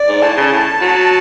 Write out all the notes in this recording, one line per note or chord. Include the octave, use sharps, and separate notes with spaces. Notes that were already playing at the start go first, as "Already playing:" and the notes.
Already playing: D5
G#2
A2 A5
C#3
A2
F#3